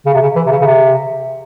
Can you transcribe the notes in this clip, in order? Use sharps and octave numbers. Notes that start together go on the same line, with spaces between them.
C#3
C3
C#3
E3
C3
C#3
C#3
C3